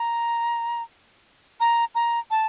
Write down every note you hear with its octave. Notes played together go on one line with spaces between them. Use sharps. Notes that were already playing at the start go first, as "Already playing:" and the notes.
Already playing: A#5
A#5
A#5
A5